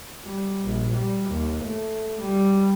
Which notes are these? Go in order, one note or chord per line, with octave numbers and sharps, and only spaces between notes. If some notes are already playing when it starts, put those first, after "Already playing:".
G3
A#1
G3
D#2
A3
G3